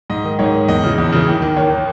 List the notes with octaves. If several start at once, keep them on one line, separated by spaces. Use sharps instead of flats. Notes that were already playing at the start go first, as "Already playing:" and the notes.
G#2 D#5
D#3
G#2 C#5
D#3
E2 D#5
C#3 E3
E2
C#3 E3
D#2
D#3
D#2 C#5
D#3